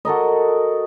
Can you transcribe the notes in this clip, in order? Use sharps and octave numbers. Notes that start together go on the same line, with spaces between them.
F#4 A4 A#4 D#5